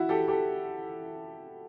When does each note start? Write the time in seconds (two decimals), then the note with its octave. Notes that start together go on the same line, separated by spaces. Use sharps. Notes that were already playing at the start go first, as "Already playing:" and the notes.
Already playing: E4 F#4
0.09 G4 A4
0.28 G4 A4